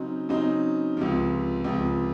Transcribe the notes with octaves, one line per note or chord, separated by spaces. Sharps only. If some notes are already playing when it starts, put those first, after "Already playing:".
Already playing: C#3 F#3 C4 D#4
C#3 F#3 C4 D#4
C#2 C3 F3
C#2 C3 F3